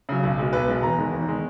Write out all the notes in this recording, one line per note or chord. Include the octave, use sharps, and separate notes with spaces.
C#3 F#3
B1
B2 G#3
B1 B4
B2 G#3
E2 A#5
D#3 G#3
E2
D#3 G#3